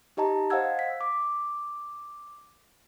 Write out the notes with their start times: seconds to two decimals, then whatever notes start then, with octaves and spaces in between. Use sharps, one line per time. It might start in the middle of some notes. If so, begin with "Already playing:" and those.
0.17 D#4 G4 D#5 A5 A#5
0.50 C5 D#5 F5 F#5 E6 G#6
0.79 B6
1.01 D6